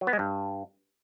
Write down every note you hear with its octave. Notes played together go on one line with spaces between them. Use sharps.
F#3
B3
G#3
G2